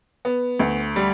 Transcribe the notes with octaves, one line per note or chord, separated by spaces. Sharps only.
B3
D2
G3